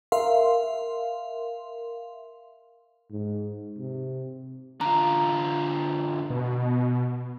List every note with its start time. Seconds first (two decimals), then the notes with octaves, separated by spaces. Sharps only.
0.12 A#4 E5 F5 C6
3.11 G#2
3.78 C3
4.81 D3 F4 A#5
6.30 B2